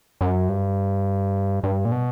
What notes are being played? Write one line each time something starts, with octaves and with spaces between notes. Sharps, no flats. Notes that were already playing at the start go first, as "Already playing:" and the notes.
F#2
G2
G2
A#2
B2